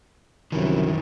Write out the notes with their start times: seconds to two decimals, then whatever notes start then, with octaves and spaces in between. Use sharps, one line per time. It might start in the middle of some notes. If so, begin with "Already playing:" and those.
0.52 C2 F#2 C3 D#3 E3